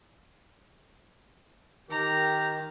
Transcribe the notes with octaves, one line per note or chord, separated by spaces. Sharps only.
D#3 G4 A#4 A#5